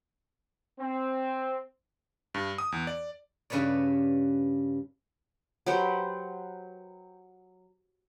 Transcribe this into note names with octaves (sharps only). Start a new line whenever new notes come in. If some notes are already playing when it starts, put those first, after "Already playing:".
C4
G2
D#6
E2
D5
G2 C#3 B4 C#5 D5
F#3 G4 B4 C5